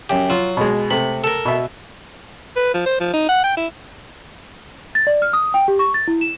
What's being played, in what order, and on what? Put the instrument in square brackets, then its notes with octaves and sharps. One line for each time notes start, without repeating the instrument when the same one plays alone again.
[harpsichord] F#2 G4
[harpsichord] F#3 [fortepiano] F4
[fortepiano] B2 G#3
[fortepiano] C3 A3 [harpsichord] B5
[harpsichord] A4 A#4
[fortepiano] B2 E5
[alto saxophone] B4
F3
C5
F3
D#4
F#5
G5
E4
[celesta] A6
D5
F6
D#6
G5
G4
C#6
A6
E4
E7